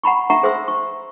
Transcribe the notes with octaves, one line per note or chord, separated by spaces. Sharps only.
F#5 A#5 B5 C#6
E5 F#5 A#5 C#6
G#4 C5 E5 C6 E6
C#6